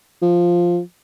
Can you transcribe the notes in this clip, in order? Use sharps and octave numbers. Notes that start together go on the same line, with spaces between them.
F3